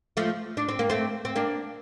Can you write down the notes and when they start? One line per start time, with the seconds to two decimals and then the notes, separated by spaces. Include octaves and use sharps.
0.17 F3 A3
0.57 D4
0.69 C4
0.79 A#3
0.90 A3 C4
1.25 C4
1.36 A#3 D4